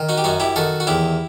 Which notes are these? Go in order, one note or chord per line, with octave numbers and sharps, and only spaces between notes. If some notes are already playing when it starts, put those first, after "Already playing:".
Already playing: D#3
D#4 F#4
G4
F#2 D#4 F#4
E4 G4
D#3 F#4 A4
F#4
E2 E4 G4